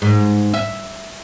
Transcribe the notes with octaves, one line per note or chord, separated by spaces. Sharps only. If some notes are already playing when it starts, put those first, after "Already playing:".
G#2
E5